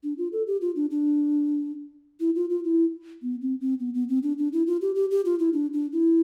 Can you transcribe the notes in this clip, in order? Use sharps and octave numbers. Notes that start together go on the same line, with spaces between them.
D4
F4
A4
G4
F4
D4
D4
E4
F4
F4
E4
B3
C4
C4
B3
B3
C4
D4
D4
E4
F4
G4
G4
G4
F4
E4
D4
D4
E4